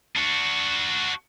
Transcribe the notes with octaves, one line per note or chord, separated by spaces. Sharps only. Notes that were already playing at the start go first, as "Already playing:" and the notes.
D4 F#4